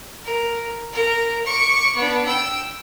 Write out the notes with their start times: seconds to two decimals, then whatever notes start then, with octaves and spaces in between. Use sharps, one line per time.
0.24 A#4
0.93 A#4
1.46 C#6 D6
1.96 B3 D4
2.26 G5 E6